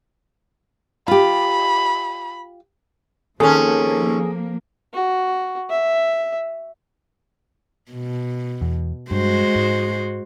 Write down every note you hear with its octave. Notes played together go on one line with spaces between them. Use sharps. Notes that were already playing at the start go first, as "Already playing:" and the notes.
F4 G4 B5
D#2 F3 A#3 C4 C#4 G#4 A4
F#4
E5
B2
E2
G2 G#3 F#4 C5
G#2